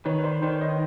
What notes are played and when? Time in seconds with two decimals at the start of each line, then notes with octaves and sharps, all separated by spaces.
0.05 D#3 B4 C#5
0.23 C5 D5
0.42 D#3 C5 D5
0.61 C#5 D#5